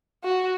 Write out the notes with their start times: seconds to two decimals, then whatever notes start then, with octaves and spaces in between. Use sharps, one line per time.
0.24 F#4